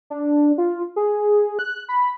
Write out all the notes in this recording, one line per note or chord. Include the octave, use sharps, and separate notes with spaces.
D4
F4
G#4
F#6
B5